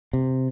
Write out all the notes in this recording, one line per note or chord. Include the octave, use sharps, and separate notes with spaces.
C3